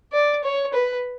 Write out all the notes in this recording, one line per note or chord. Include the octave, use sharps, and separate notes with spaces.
D5
C#5
B4